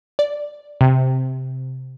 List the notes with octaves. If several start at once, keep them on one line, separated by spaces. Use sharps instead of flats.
D5
C3